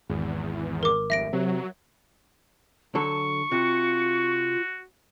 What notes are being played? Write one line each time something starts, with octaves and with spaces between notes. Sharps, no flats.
G#1 E2
A#4 D6
F1 E5 A#6 D7
C3 F#3
D3 F#3 A4 C#6
C3 F4 F#4